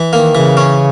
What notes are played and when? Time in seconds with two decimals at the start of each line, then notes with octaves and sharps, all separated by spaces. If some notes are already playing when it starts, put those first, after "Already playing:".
Already playing: E3
0.13 D#3 A#3
0.35 C#3 E3
0.57 C#4